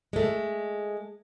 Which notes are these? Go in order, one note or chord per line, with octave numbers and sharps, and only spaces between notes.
G#3 A3